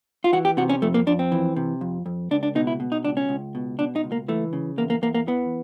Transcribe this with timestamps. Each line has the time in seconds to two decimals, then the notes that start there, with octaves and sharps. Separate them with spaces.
0.24 F4
0.33 E3 F#4
0.45 G4
0.57 C3 F#4
0.69 C#4
0.82 F2 A3
0.94 A#3
1.07 F2 D4
1.19 C4
1.32 E3
1.56 C3
1.81 F2
2.06 F2
2.31 C#2 D4
2.43 D4
2.55 B2 D#4
2.67 E4
2.80 B2
2.92 D#4
3.04 C#2 D4
3.17 C#4
3.29 C#2
3.55 B2
3.79 B2 D4
3.96 D#4
4.04 C#2
4.12 A#3
4.28 E3 A3
4.53 C#3
4.78 E2 A#3
4.90 A#3
5.02 E2 A#3
5.14 A#3
5.27 E3 B3